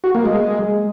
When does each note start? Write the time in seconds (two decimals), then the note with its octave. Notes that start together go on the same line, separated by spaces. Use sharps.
0.04 F#4
0.15 A#3
0.25 G#3